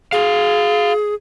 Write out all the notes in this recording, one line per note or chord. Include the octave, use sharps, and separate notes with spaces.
F#4 G#4 F5